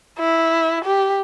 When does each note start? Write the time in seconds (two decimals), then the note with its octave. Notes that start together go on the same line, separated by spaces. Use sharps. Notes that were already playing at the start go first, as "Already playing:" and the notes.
0.19 E4
0.84 G4